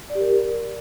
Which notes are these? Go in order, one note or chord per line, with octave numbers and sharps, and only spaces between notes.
D5
G4
A#4